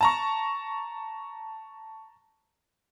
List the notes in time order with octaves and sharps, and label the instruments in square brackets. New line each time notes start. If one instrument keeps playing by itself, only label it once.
[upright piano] A5 A#5 C#6